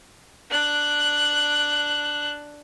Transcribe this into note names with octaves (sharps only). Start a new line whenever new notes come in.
D4 F#6